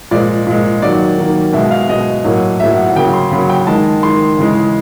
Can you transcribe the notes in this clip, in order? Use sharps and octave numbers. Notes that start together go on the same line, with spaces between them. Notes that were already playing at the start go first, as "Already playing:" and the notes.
A#2 F3 G#3 D5
A#2 F3 G#3
D#3 F#3 A#3 D5
D#3 F#3 A#3
B2 G#3 E5
F5
B2 G#3 D#5
A2 F#3 A#3
A2 F#3 A#3 E5
F#5
C#3 F#3 A#3 G5
C6
C#3 F#3 A#3 B5
G5
D#3 G#3 A5
D#3 G#3 C6
C#3 E3 G#3